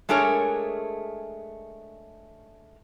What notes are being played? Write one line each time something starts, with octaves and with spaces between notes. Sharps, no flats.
G#3 A3 D4 G#4 A#4 C#5